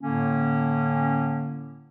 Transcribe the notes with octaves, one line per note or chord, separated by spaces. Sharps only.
A2 D3 A#3 C#4